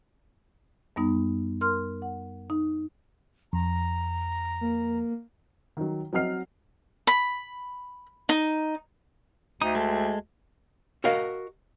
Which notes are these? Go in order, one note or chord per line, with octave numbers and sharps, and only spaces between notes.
F#2 G3 B3 D#4
A#4 C6 F6
F#5
D#4
F2 A#5
A#3
D#3 F#3
F#3 C4 D#5 F#5 F6 C7
B5
D#4
D2 D#4 D#6
G#3 A4
F#4 A#4 D#5 F5